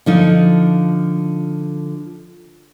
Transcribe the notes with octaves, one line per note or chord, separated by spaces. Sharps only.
D3 F3 D#4